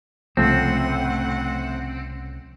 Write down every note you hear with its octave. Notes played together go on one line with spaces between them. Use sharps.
C2 A2 C#3 F3 A3 C4 F#5